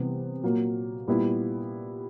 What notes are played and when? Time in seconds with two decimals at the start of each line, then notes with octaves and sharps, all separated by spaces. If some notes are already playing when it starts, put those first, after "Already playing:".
Already playing: C3 E3 G3 B3
0.43 A#2 F#3 A#3
1.08 A#2 G3 B3 E4